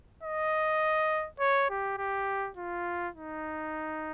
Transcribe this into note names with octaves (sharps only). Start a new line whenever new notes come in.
D#5
C#5
G4
G4
F4
D#4